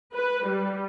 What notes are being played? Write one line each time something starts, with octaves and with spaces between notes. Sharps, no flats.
B4
G3